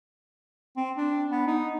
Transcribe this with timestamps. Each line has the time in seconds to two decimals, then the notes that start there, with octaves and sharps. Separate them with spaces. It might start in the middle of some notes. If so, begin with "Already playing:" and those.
0.77 C4
0.97 D4
1.31 B3
1.47 D#4